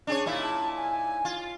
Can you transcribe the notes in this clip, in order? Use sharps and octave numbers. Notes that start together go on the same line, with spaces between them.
C#4 D4 G#4 C#5
A#2 D#4 E4 F5
A5
G#5
F4